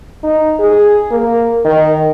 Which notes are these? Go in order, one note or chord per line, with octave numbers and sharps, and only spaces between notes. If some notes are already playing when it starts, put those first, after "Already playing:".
D#4
G#4
A#3
D#3